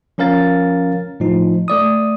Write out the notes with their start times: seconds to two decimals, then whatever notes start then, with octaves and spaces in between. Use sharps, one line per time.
0.18 F3 C#4 A#4 F5 A6
1.20 A2 F3 D#4
1.68 A3 D5 D#6